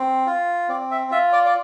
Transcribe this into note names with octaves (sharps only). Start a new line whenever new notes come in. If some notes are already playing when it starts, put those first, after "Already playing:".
Already playing: C4
F4
C4 D5
E5
F4 E5
D5
D5